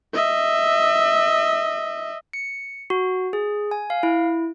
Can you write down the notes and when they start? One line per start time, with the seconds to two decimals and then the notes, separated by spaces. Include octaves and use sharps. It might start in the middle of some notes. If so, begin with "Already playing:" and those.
0.14 D#5 E5
2.33 C#7
2.90 F#4
3.33 G#4
3.71 G#5
3.90 F5
4.03 E4